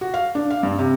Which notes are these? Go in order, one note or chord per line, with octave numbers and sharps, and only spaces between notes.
F#4
F5
D4
F5
G2
C3